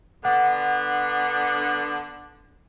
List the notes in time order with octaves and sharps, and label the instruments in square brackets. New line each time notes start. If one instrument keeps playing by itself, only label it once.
[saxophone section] D3 B3 D4 [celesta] F#5